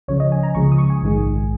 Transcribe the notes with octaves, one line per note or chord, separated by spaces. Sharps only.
C#2 C#3 F3 C#5
D#5
G#5
A#5
C#2 C#3 F3 G#3 C#6
D#6
C#6
G#5
A#1 G#2 D#3 G#3